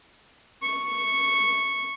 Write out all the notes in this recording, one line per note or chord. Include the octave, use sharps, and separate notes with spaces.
C#6